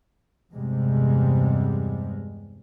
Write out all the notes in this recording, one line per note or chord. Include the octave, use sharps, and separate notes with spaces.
E2 G2 C3 G3 G#3